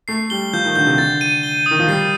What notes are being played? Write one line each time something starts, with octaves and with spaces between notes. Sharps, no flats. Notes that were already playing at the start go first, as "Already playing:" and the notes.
A3 C7
G3 G7
F3 G6
D#3
D3 G6
C3
D3 A6
D#7
G7
D#6
D#3
F3
G3 C7